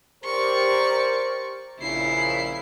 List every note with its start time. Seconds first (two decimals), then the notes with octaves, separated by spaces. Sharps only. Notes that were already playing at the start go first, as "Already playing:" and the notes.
0.24 G4 A#4 C5 D5 C#6
1.80 A#1 C#3 E4 C7